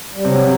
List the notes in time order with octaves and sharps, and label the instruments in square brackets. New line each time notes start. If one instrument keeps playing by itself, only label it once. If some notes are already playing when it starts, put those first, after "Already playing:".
[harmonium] G3
[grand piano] C3 [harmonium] F#3